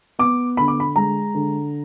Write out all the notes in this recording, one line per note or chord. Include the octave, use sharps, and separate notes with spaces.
B3 D6
D3 B5
D6
B5
G#3 A#5
D3